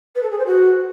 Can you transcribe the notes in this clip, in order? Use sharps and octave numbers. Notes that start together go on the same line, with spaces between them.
B4
A4
G#4
C5
F#4